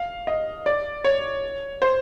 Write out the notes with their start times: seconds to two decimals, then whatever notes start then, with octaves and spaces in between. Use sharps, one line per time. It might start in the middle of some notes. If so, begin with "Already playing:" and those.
Already playing: F5
0.27 D#5
0.66 D5
1.04 C#5
1.82 C5